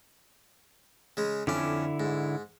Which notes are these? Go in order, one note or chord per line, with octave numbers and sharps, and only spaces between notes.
C#3 G#3
F2 D3 C#4 E4 D6
G#2